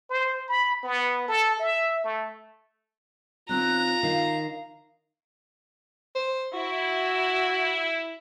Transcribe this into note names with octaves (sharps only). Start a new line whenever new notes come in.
C5
B5
B3
A4
E5
A3
D#3 C4 C#4 F4 A#5 F#6
D#3 D#4 F5
C5
E4 F#4